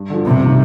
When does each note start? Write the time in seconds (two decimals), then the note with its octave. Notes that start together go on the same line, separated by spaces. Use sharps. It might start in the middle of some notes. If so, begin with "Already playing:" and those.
Already playing: G2
0.10 D3 F3
0.25 G2 C3
0.43 D#3 A#3 D#4